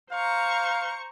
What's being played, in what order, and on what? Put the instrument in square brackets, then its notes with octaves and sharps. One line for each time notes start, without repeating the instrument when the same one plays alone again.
[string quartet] C5 A#5 C#6 [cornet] F5